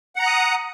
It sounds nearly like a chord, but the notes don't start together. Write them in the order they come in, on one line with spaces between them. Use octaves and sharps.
F#5 A#5 F#6 D#6